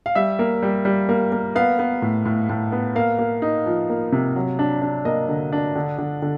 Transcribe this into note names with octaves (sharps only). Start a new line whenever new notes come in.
F5
G3 E5
A#3
G3
G3
A#3
A#3
B3 F5
B3
A2
A2
A2
B3
A#3 F5
A#3
D#4
F3
A#3
C3
F#3
D4
D4
A#3 D#5
D3
D4
D3
D3
D3